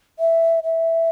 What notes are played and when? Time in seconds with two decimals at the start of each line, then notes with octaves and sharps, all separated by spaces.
0.19 E5
0.63 E5